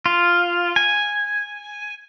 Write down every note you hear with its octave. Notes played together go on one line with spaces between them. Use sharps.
F4
G#5